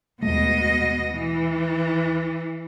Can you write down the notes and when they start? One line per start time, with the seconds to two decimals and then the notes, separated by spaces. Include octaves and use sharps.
0.22 D#2 B2 G#3 A3 D#5
1.12 E3